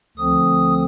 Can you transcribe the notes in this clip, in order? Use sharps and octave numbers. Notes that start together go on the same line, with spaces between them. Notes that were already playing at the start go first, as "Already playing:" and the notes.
D2 D3 F3 C4 D#6